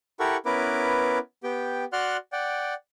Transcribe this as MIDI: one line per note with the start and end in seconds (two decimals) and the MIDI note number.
0.20 0.37 64
0.20 0.37 67
0.20 0.37 69
0.20 0.37 70
0.20 0.37 78
0.20 0.37 85
0.46 1.18 59
0.46 1.18 61
0.46 1.18 64
0.46 1.18 70
0.46 1.18 71
0.46 1.18 86
1.43 1.84 59
1.43 1.84 67
1.43 1.84 79
1.93 2.17 66
1.93 2.17 74
1.93 2.17 78
1.93 2.17 84
1.93 2.17 89
1.93 2.17 90
2.32 2.74 74
2.32 2.74 78
2.32 2.74 79